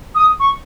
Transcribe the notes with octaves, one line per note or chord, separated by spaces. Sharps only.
D#6
C#6